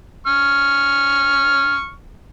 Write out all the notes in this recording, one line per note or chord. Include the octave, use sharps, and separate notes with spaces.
C#6 F6